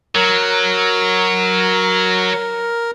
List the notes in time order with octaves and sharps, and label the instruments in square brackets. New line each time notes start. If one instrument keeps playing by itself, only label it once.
[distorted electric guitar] F#3 [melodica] A#4